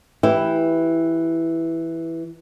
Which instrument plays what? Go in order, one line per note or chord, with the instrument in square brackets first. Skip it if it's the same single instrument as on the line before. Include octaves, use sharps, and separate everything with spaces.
[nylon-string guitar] E3 E4 G4